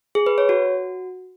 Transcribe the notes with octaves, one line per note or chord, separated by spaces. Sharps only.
G#4
B4
C#5
F#4